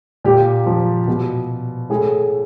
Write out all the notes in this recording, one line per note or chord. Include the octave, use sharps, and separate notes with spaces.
A#2 G4
F3
B2
A2 G#4